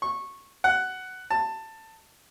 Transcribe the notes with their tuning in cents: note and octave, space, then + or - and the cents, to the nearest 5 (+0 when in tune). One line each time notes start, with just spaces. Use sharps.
C#6 -15
F#5 +10
A5 +15